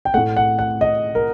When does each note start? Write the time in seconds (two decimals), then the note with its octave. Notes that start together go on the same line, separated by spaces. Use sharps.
0.05 G5
0.14 A2 A3 F#5
0.37 F#5
0.59 F#5
0.81 D#5
1.15 A#4